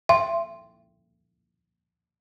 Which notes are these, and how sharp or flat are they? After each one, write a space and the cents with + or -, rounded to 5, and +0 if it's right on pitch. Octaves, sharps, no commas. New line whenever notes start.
E5 +30 G5 -10 C6 +0